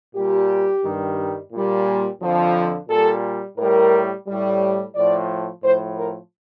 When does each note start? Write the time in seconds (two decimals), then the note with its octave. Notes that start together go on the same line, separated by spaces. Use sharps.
0.16 A#2 G3 G4
0.84 G2 D#3 G3
1.53 A#2 G3
2.21 F2 D3 F3
2.89 A#2 G3 A4
3.58 A2 G3 A#4
4.27 A2 G3
4.95 A2 F3 D5
5.63 A2 F3 C5
5.98 A#4